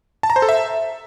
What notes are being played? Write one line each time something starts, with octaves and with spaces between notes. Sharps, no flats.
A5
A#5
C5
A4
E5